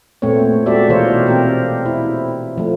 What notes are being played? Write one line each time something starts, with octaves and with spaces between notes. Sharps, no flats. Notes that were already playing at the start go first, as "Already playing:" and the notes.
A#2 A3 B3 C4 C#5
G#3 F#4 G4 A4 D5 E5
B2 E3 F4 A#4 C5 C#5
C4 G4 A#4
E4
F3 A3